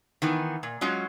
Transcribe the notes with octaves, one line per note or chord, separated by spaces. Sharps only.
D#3 E3 B3
A#2
F#3 G#3 C#4 F4